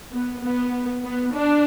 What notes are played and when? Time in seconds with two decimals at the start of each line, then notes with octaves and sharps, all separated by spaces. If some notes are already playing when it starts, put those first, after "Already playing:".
0.13 B3
0.43 B3
1.04 B3
1.34 D4